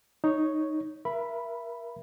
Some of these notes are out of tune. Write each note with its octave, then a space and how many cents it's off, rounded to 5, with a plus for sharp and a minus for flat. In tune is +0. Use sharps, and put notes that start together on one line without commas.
D#4 +0 C#5 +0
A#4 +25 E5 +25 B5 +0